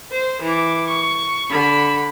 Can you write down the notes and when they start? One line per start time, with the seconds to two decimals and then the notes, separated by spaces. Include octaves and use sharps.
0.12 C5
0.42 E3 D6
0.88 C#6
1.50 D3 B5